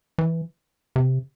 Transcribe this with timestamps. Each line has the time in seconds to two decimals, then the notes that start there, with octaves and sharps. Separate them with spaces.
0.18 E3
0.96 C3